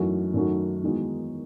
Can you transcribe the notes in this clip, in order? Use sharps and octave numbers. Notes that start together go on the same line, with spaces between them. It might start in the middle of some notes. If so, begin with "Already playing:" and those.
Already playing: F#2 E3 A3 D#4 F#4
F#2 D#3 A3 D#4 F#4
E2 D#3 G#3 D#4 F#4